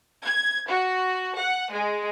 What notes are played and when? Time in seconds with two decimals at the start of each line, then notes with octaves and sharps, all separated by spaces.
0.23 G#6
0.69 F#4
1.39 F#5
1.71 G#3